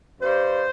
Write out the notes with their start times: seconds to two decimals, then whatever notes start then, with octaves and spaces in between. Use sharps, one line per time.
0.20 G2 C5